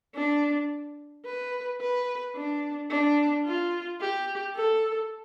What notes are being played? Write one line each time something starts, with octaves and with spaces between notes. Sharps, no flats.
D4
B4
B4
D4
D4
F4
G4
A4